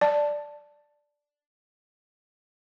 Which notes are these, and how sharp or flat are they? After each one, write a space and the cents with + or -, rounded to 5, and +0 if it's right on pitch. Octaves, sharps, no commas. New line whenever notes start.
D5 +0 A5 +0